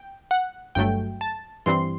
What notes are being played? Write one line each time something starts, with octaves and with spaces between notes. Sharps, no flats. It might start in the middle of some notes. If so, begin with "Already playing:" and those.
Already playing: G5
F#5
G1 G2 F#3 A3 G5
A5
G2 E3 G3 C4 C6